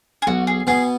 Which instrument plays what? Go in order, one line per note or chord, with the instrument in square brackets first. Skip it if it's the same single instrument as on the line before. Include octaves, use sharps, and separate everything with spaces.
[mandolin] G#4
[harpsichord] B1 [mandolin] F#4
[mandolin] G#4
[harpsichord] B2 B3 [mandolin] G#4